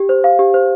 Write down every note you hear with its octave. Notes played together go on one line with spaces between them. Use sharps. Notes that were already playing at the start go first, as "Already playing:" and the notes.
Already playing: G4
C5
F5
G4
C5